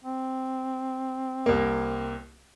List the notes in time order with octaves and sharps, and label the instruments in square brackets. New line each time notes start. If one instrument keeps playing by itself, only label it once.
[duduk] C4
[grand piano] C2 A#3